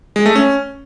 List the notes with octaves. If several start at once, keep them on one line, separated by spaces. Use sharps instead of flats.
G#3
A3
C#4